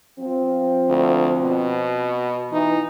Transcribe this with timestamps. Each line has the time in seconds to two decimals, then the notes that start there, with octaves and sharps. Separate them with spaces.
0.20 F3 C4
0.89 D2
1.41 B2
2.52 E3 D#4